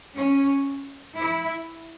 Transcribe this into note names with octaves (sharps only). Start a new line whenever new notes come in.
C#4
E4